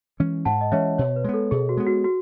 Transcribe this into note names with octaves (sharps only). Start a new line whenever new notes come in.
E3 G#3 C#4
G#2 F#5 A5
D#5
E3 G#3 C#4 C#5 E5
B2 C#5
B4
G#3 B3
A4
B2 G#4
F#4
G#3 B3
F#4
F#4